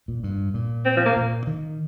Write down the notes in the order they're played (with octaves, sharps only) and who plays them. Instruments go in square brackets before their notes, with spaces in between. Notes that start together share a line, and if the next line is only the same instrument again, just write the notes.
[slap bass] A#2
G2
A#2
[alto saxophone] C4
F3
A#3
[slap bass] A#2
D#3